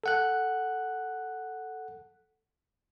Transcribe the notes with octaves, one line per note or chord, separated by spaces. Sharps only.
A4 F#5 F#6